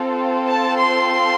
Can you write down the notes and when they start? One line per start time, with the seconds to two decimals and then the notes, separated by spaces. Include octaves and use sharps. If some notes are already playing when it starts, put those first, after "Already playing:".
Already playing: C4 F4 A4
0.49 A5
0.78 C6